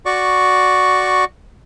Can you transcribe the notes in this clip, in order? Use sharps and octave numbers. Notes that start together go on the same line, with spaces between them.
F#4 D5 C#6